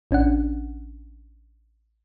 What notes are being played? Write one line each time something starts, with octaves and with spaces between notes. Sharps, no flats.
A1 C#4 D4 F#5